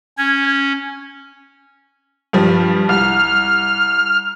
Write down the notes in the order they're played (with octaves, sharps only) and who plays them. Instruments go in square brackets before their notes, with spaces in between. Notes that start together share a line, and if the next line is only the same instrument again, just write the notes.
[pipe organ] C#4 [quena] G#6
[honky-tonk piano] G2 F3 G3
[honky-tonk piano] C2 [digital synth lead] F6